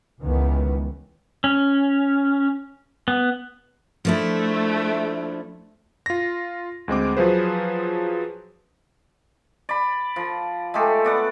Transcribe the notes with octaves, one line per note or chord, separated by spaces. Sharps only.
C#2 D#3 E3 B3
C#4
B3
F3 A3 D4 E4
F4 A#6
D2 G#3 C4 D6
F3 F#3 F4 G#4 B4 C5
D5 B5
F3
G#3 A3 G4 A4
B3 D5 F#5